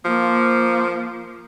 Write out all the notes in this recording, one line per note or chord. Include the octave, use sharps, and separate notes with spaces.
F3 A#3